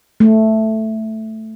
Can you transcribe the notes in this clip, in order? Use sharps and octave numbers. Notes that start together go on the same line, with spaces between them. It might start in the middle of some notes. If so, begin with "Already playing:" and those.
A3